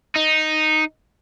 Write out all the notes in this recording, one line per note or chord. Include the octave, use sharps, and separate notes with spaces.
D#4